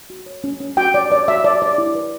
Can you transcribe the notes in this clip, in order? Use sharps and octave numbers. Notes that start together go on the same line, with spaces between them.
F#4
C#5
C#4
C#4
F#4 G5
C#5 D5
C#5 D5
F#4 E5
F#4 D5
C#5 D5
E4
B4